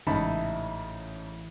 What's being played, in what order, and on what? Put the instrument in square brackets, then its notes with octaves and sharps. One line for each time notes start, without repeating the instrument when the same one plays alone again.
[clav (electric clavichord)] A1 [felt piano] G#2 C#3 [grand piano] D#4 A5 B5 [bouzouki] E4 D#5